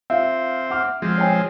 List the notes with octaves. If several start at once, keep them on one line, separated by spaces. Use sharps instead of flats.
C4 F4 E5 F5
F#5 D6 F6
F3 G#3 C4
C#5 G5 G#5